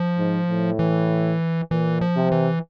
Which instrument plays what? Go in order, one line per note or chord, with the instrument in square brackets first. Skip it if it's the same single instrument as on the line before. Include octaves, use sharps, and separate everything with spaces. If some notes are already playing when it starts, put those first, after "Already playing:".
Already playing: [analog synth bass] F3
[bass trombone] G#2
A2
[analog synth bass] E3
[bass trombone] A#2 [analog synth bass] E3
[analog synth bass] F3
[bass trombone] C3
[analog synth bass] E3